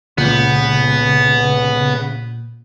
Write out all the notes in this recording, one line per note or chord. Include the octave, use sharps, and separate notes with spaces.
C#2 A#2 C#3 B3 G6